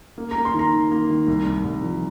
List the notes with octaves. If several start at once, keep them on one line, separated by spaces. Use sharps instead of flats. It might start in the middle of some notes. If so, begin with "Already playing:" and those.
A#3
A#3 A#5
C6
D#3
A#5
D#3
A#3
D#3
C2
C2
C2
F3